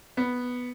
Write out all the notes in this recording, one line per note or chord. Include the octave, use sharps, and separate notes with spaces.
B3